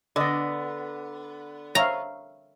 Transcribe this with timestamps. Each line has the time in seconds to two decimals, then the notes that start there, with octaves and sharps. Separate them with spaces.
0.16 D3 B3 D5 D#5
1.75 C#5 E5 F5 A#5